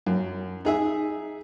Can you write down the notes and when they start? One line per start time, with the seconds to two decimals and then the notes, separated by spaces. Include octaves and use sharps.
0.06 F#2
0.65 D#4 G#4 E5